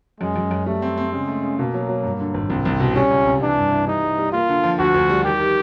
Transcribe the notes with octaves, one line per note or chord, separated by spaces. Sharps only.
F#2 G#3
F#2
F#2
G3 A3
C4
C4
C#3 G#3
A3
C#3
B2 A#3
F#3
F#3
G2
D3
G#1
C2 C4
C2
B2
G3 C#4
C#2
C3
E3 D4
G2
E3
G3 D#4
G3
G3
A#3 F4
D3
F3
D2 F#4
D2
G3
D#3 G4
D#3